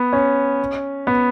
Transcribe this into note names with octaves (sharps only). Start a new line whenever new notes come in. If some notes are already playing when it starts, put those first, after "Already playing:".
Already playing: B3
C#4
B3